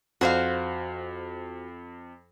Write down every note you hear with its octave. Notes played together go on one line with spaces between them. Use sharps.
F2 F#4 C5 F5